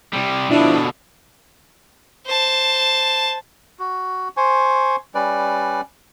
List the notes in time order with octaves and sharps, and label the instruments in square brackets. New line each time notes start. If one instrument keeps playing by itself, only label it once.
[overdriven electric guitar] C3 G3
[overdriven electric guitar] B2 D3 [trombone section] F3 E4 [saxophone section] D4
[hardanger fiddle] C5 A5
[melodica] F#4
C5 G#5 C#6
G3 C#4 B4 D5